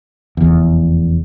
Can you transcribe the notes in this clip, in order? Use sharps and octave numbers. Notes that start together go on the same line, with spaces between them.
F1 E2